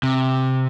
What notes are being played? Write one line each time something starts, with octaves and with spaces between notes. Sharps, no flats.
C3